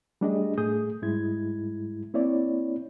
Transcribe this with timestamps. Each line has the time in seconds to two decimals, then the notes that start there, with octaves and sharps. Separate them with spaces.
0.21 G3 A3 D4 G4 G#4 D#5
0.58 A2 A3 G#4 D#6 G6
1.02 G#2 G3 G#3 E4 G#6
2.14 A#3 C4 E4 C#5 D5